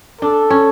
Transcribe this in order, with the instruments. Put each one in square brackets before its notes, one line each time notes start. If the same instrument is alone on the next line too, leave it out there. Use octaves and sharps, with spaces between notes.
[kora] D4 [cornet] A4
[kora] C#4